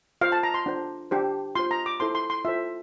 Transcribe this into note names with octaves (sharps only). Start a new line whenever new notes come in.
F4 C5 F5
A5
A#5
C6
D4 F4 C5
D4 G4 C5
F4 C5 C6
A#5
D6
E4 A4 C5 C6
C6
C6
F4 A4 C5 E5